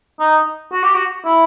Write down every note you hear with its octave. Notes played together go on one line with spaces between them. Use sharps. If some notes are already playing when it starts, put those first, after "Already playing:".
D#4
F#4
G4
F#4
E4